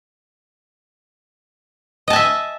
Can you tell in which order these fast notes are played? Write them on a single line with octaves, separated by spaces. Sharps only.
D#5 A5 G#5 E5